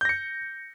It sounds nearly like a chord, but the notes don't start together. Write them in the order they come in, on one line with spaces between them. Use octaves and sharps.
G6 A#6 C#7